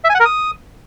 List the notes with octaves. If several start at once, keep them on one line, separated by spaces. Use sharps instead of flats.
E5
G#5
F#5
A#4
D#6